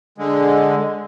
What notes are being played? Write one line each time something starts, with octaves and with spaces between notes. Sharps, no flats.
D3 G#3